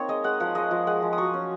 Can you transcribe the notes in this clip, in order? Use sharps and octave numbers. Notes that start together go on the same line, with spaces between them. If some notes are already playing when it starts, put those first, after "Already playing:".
Already playing: A#3 C4 D#4 C#5
G#3 D#5
G#3 F#5
F3 F#5
G#3 D#5
F3
G#3 F#5
F3
D#6
F#3 C#6
C#4